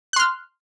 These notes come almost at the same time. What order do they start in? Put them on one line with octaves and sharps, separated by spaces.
F#6 C6 F6